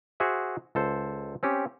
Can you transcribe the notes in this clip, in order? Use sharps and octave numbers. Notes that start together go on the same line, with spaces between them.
F#4 G#4 C5 E5
C#2 A4 C5
C4 C#4 G4